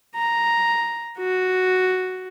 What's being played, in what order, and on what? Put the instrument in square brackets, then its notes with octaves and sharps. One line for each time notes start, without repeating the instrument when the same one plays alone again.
[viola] A#5
F#4